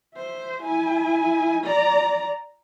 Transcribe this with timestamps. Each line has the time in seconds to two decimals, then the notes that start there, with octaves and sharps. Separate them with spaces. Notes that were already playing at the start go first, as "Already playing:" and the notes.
0.14 C5 E5
0.62 E4 G#5
1.63 D5 A#5